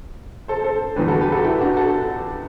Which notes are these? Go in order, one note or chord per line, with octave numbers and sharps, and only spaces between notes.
A4 C5
A4 C5
E2 D3 G3 G4 B4
F#4 A4
G4 B4
F#4 A4
E4 G4
D4 F#4
F#4 A4